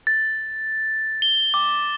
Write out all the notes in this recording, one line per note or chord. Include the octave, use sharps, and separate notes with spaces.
A6
G7
D6